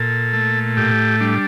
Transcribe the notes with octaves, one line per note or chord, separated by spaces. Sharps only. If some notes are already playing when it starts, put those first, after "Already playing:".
Already playing: A#2 A4
A3
A2 G4
G3 D4